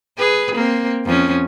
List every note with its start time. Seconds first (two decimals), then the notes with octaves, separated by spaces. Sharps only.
0.18 G#4 B4
0.55 A#3 C4
1.05 F2 C#4